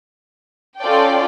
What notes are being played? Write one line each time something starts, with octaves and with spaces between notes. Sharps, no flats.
C#4 F4 A4 D5 G5